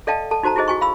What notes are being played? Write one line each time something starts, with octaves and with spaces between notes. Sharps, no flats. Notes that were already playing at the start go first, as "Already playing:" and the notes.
A4 D5 D#5 F5 G5 A5
A4 A5
D#4 F#4 C5 A5 A#5
E4 F#4 G#4 C5 D#5
F#4 G#5 C#6
F5 B5 E6